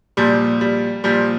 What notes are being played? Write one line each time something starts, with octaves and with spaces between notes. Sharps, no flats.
A#2 F3 G3
G3
A#2 F3 G3